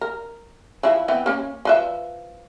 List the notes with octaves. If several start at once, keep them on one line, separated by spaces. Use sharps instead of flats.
A#4
E3 F3 E4
E3 B3 C4
A#3 C#4
F3 B4 E5